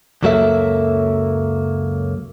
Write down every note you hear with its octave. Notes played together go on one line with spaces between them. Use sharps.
C#2 F#2 F#3 A#3 A4 E5